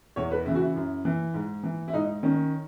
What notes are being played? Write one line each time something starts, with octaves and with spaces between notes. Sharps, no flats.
E2 C#5
B4
C#3 E3 E4
F#4
E4
F#2
E3
G#2
E3
E4
G#2 D#4
D#3 C#4